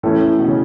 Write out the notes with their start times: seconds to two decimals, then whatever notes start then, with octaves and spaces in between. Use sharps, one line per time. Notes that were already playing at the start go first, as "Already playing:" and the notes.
0.03 A2 E3 C#4 E4 A4
0.39 B2
0.48 C#3